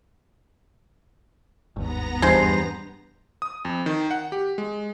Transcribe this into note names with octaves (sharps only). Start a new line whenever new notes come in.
G1 D#2 G#2 B3 A#5 A#6
E2 G2 G#3 C5
D#6
F2
D#3
F#5
G4
G#3